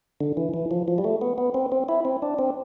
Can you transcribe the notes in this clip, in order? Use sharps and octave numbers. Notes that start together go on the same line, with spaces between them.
D3
E3
E3
F3
F3
G3
A3
B3
B3
C4
C4
E4
C4
D4
C4